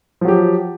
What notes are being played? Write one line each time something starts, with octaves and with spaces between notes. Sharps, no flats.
F3 F#3 G4